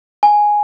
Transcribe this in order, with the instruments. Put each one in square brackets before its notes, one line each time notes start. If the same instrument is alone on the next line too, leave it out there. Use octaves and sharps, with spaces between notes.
[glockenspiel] G#5